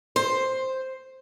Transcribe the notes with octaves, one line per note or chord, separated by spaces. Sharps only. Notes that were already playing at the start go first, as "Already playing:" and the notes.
C5